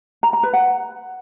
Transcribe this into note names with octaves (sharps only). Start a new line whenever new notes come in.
A#5
A#5
B4
F#5